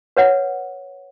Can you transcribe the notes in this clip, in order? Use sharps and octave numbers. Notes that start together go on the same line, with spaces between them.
B4 C#5 F#5